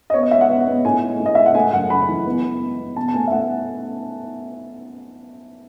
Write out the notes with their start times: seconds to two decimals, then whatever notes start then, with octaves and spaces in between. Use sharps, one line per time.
0.10 D#5
0.14 B3 C#5
0.23 D#5
0.31 G#3 E5
0.41 F#5
0.49 B3
0.67 B3
0.85 A2 G#5
1.03 G#3
1.20 A2
1.26 D#5
1.35 G#3 E5
1.46 F#5
1.55 A3 G#5
1.73 F#2 F#5
1.90 F#2 B5
2.09 E3
2.26 B3
2.44 B3
2.62 G#3
2.79 B3
2.96 B2 A5
3.08 A5
3.14 A3 G#5
3.27 E5
3.32 A3 F#5